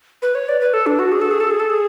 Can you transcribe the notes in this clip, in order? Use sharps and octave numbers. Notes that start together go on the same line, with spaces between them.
B4
C#5
D5
B4
A4
D4
F#4
G#4
A4
G#4
A4
G#4
A4
G#4